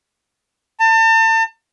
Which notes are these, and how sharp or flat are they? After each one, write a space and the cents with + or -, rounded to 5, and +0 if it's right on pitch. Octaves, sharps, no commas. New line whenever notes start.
A5 +35